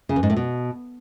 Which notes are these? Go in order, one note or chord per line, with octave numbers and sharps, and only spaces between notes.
C#3
E2
G#2
A2
B2